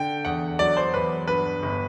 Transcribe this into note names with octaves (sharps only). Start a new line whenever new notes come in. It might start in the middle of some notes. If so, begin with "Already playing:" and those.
Already playing: D3 G5
E2 F#5
F#3 D5
C5
E2 B4
G2 B4
G1